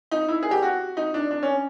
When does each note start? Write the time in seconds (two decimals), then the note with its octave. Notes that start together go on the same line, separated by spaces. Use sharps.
0.11 D#4
0.28 E4
0.43 G#4
0.51 G4
0.62 F#4
0.97 D#4
1.14 D4
1.31 D4
1.43 C#4